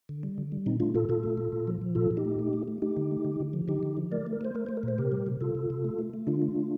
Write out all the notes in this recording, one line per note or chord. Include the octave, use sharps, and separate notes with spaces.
D3
G3
D3
G3
A#2 C4 D#4
A3 D4 F4
A#2 F4 A4
A#2 F4 A4
A3
A#2
A#2
F3
F3
A#2 F4 A4
A#2
D#4 G4
A3
A3
A3
A3
A3 D#4 G4
D3
A3
D3
D3
F3
D3 D#4 G4
D3
F3
A3 A#4 D5
A3
A#4
A3 C5
A3 A#4
A3 C5
A#4
A#2
C5
C3 G4 A#4
G3
C3
C3 F4 A4
C3
C3
A3
A3
A3
D3 D4 F4
A3
A3